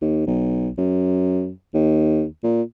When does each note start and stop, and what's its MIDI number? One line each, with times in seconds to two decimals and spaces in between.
0.02 0.27 39
0.27 0.70 35
0.79 1.51 42
1.74 2.25 39
2.44 2.62 46